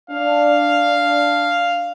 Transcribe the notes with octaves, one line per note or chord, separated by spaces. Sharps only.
D4 D5 F5